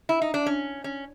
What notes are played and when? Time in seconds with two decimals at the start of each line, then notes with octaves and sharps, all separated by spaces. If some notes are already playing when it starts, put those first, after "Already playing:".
0.09 E4
0.22 D#4
0.34 D4
0.46 C#4
0.84 C#4